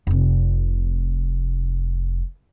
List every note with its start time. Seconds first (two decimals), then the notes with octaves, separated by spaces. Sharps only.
0.07 F1 C3